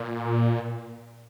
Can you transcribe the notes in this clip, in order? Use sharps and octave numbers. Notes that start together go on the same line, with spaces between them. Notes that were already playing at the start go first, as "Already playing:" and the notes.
Already playing: A#2